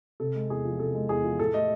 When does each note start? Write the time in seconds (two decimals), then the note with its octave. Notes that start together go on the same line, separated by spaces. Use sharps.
0.20 C3 A4
0.35 G#3
0.50 E2 G#4
0.65 F3
0.79 C3 A4
0.94 G#3
1.09 E2 G#4
1.24 F3
1.39 A2 A4
1.54 A3 D#5